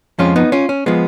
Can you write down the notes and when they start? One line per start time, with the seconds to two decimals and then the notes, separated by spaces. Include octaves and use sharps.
0.19 F2 F3 G#3 C#4 F4
0.36 B3 D#4
0.52 C#4 F4
0.69 C#4
0.86 F3 G#3 B3